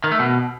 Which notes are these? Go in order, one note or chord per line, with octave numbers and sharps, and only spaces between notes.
D#3
A3
B2